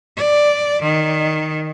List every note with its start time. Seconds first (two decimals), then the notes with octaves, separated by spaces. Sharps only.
0.17 D5
0.82 D#3